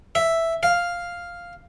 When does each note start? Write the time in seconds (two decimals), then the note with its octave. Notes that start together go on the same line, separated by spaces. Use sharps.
0.15 E5
0.63 F5